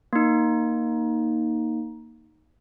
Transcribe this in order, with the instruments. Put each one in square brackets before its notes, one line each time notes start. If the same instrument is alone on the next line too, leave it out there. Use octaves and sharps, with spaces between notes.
[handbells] A#3 D#4